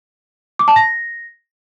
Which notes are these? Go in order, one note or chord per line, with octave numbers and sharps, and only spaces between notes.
D6
A5
A#6